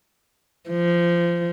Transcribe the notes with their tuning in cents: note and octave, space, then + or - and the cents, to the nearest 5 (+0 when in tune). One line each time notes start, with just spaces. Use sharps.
F3 -20